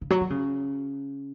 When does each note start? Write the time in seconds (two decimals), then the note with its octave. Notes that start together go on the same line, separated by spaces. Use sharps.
0.01 C#3
0.10 F#3
0.21 D#3
0.30 C#3